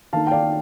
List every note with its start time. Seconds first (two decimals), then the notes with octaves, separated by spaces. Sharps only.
0.13 D#3 A#3 D#4 F5 A5
0.27 G5
0.31 D5 F5